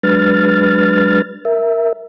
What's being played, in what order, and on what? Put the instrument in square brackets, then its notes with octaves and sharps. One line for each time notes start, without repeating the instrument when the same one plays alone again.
[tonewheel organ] F#3 G#3 D4 B4 F6 A6
A#4 E5